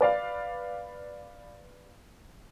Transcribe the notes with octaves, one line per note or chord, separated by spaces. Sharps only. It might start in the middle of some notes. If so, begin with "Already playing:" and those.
B4 D5 F5